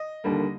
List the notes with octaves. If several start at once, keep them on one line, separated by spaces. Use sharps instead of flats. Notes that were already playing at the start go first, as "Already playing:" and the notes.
Already playing: D#5
D#2 D3 G3 A#3